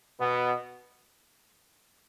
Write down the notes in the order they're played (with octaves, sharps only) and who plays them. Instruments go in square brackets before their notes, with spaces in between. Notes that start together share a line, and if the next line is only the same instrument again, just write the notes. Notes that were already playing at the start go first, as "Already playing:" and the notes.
[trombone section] B2 B3